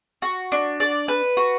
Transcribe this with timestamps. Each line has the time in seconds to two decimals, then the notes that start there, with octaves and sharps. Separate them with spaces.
0.22 F#4
0.52 D4
0.80 D5
1.08 B4
1.37 F#4